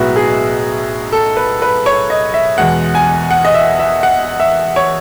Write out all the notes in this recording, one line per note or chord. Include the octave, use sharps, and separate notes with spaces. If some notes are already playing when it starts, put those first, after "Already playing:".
Already playing: B1 A2 G#3 B3 F#4 E5
G#4
A4
B4
B4
C#5
D#5
E5
E2 B2 G#3 F#5
G#5
F#5
D#5
E5
E5
F#5
E5
C#5